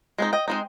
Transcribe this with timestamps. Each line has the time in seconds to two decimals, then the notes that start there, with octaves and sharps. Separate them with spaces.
0.18 G#3 C4 D#4
0.33 D#5 G5
0.48 G#3 C4 D#4